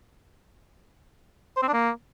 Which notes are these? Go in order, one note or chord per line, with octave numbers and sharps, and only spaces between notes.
C5
C4
D4
A#3